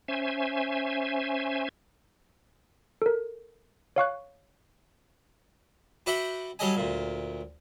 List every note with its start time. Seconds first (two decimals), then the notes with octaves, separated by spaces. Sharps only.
0.08 C#4 C5 E5 G#5
3.02 A4 A#4
3.96 C#5 F5 C#6 F#6
6.06 F#4 B4 D5 E5 F#5 G5
6.59 F#3 G3 A4 D#5 G#5
6.77 D2 A#2